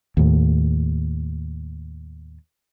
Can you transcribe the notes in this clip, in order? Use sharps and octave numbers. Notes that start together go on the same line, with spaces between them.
D#2 A2